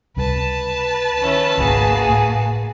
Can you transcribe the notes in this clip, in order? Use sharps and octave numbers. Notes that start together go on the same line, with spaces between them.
C#2 C3 G3 B4 A5
D#3 C#4 E4
G#1 C#2 A#3 F#4 G#4
A2